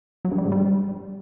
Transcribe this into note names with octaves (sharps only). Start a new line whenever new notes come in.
F#3
G2
G3
G#2
G3